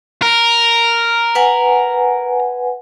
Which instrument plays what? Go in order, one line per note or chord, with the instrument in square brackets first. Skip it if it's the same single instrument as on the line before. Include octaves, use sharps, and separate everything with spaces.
[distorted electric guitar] A#4
[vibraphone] B4 F#5 G#5